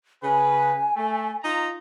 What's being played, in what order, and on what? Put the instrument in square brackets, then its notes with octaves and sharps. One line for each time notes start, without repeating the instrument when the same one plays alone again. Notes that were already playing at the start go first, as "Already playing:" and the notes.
[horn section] C#3 B4 [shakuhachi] G#5
[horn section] A3
D#4 F4 A#5